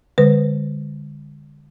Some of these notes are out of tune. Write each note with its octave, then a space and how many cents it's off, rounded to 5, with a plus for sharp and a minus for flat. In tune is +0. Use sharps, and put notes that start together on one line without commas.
D3 +0 G#3 -40 B4 +0